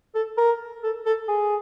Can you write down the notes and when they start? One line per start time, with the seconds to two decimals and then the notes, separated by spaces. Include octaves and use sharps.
0.15 A4
0.37 A#4
0.83 A4
1.06 A4
1.28 G#4